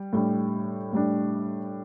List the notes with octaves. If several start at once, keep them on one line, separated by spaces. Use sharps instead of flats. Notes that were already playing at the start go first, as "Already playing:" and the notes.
Already playing: G3
A2 G3 D4
A2 G3 D4